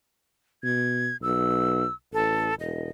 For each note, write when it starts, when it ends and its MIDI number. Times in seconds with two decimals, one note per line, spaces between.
0.63 1.10 47
0.63 1.17 92
1.22 1.84 35
1.22 1.94 88
2.13 2.50 33
2.13 2.54 69
2.60 2.89 28
2.60 2.90 75